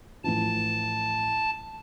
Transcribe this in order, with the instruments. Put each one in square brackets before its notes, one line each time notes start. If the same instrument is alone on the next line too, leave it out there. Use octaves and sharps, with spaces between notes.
[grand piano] A2 E3 F3 [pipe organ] A5